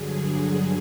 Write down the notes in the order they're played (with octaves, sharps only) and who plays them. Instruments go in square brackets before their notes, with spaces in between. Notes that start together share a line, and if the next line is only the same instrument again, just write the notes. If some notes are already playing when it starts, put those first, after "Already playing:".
Already playing: [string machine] G2 D3 F#3 G#4